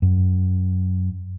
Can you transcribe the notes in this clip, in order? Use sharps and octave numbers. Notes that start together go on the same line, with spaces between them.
F#2